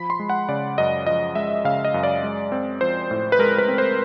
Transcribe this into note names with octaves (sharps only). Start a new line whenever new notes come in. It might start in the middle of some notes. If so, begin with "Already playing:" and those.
Already playing: F3 B5
C6
G#3
F#5
C#3 D5
F#2 D#5
F3 D#5
G#3 E5
C#3 F5
D#5
F#2
D5
G#3
C4
F3 C5
A2
B4
G#3 A#4
B4
C4
C5